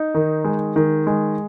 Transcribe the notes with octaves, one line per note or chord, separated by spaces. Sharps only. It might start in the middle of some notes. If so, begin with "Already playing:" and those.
Already playing: D#4
D#3
G#3
D#3
G#3